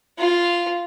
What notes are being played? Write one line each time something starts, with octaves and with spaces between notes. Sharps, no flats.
F4